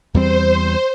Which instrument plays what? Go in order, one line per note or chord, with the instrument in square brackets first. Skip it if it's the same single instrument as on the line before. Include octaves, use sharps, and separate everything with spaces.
[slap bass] E2 G3 C4 [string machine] C5